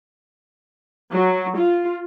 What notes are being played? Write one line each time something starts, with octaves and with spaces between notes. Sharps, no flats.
F#3
F4